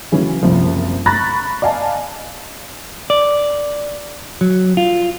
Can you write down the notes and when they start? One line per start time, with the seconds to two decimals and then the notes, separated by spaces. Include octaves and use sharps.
0.12 C#3 E3 F#3 C#4
0.43 F#1 C2 F3
1.06 A#5 B5 C#6 F#6 A6 A#6
1.62 D5 D#5 F5 G#5 A5
3.10 D5
4.41 F#3
4.77 F4